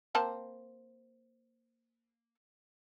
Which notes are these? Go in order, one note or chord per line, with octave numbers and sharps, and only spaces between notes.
A#3 C4 A5